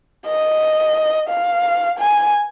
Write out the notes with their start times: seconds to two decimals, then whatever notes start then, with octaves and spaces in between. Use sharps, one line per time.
0.26 D#5
1.30 F5
1.99 G#5